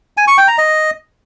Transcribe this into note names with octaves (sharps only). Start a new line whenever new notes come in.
G#5
C#6
G5
A#5
D#5